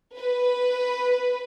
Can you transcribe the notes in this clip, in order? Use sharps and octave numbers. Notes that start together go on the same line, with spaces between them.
B4